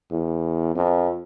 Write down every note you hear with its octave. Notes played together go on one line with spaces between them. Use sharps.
E2
F2